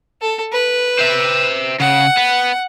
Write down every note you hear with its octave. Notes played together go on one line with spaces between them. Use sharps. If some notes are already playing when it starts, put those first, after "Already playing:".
A4
B4
C5 E5
C#3 F#5
B3